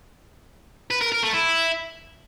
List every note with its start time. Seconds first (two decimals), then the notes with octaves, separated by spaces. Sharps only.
0.90 B4
1.01 A#4
1.12 A#4
1.23 A3
1.34 E4